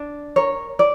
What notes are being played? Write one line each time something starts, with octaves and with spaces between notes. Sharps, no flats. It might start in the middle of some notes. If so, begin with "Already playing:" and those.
Already playing: D4
A#4 C#5
D5